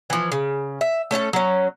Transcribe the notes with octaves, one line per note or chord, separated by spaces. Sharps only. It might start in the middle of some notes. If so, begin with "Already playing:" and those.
E3 F3
C#3
E5
A3 C#4 G#4 A4
F#3 C#4